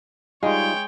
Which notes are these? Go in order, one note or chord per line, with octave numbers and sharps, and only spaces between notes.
G3 G#3 D#4 F4 C#5 G5